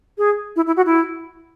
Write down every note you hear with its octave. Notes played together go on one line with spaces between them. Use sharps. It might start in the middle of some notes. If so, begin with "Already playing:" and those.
G#4
E4
E4
F#4
E4